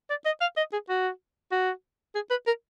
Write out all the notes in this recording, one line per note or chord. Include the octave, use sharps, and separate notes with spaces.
D5
D#5
F5
D#5
G#4
F#4
F#4
G#4
B4
A#4